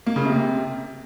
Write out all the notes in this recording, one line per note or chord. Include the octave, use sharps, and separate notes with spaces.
A#3
C#3
C3